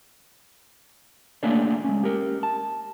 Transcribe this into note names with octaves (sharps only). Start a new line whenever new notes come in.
A3 A#3 D4 G#4 C#5 D5
G#3 C#4
G4 A#4
A5